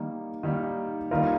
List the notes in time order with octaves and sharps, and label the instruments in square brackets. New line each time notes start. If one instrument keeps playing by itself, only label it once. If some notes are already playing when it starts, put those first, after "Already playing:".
Already playing: [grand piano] D#3 G3 A#3
D#3 G3 A#3
D#3 G3 A#3 F4 A#4